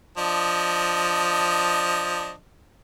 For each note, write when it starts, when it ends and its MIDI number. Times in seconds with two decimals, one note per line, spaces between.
0.18 2.32 53
0.18 2.32 62
0.18 2.32 75